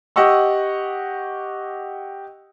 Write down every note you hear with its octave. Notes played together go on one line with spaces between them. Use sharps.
G4 D#5 F#5 C#6 E6